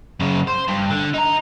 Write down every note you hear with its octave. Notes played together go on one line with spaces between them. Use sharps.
F#2 C#3
C5
G2
D3
D#4 A#5